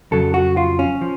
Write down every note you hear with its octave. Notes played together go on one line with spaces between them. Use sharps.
F2 C#3 F#3 A4
F#4
F4
C#4
F3